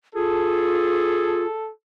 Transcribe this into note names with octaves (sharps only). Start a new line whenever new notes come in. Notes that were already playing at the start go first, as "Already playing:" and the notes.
F4 G#4 A4